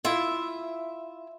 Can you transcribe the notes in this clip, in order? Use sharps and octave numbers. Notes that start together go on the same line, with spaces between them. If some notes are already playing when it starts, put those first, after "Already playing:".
E4 F4 E5